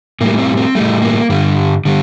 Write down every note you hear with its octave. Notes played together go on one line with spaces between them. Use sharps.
A2 G3 A#3
C4
C4
A2 G3 A3
A#3
G2 D3 G3
D3 G3